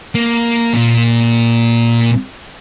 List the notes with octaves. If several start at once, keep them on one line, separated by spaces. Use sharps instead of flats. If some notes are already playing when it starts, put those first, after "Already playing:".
A#3
A#2